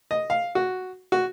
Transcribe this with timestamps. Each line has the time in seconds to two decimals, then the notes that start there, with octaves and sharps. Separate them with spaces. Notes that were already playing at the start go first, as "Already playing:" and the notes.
0.11 D#5
0.30 F5
0.55 F#4
1.12 F#4